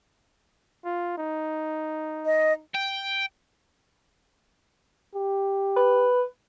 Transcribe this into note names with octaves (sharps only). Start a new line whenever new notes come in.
F4
D#4
D#5
G5
G4
B4